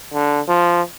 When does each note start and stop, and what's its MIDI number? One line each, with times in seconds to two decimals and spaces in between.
0.14 0.40 50
0.48 0.81 53